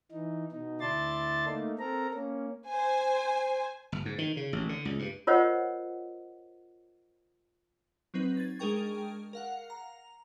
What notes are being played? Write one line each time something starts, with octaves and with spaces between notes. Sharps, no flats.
E3 D#4
B2 D#4
D2 E4 D5 A5 C6 A6
A3 A#3 D#4
C4 A4 A#4 A#5
A#3 C#4
C5 G#5
G1
G#2
D#3
C#3
A1
D3
C#2
G2
F4 A#4 C5 C#5 D#5 F#5
F#3 C4 D#4 B4
G#6 A6
G#3 D4 G#4 A#4 G5 C#6
A#4 F5 F#5
A#5